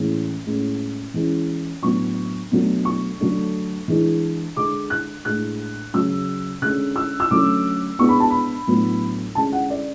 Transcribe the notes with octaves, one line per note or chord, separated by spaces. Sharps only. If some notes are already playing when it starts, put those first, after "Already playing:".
Already playing: A2 E3 G#3 C#4
A2 G#3 C#4
E3 G#3 C#4
A2 F#3 B3 D4 C#6
B2 F#3 A3 D4
C#6
D3 F#3 A3 D4
E3 G#3 D4
D3 G#3 D4 D6
F#6
A2 G#3 D4 F#6
C#3 F#3 C#4 E6
D3 G#3 C#4 F#6
E6
E6
D3 F#3 A3 C#4 D6
B2 G#3 B3 D4 C#6
B5
A5
B5
A2 F#3 B3 D4
D3 G#3 C#4 A5
F#5
D5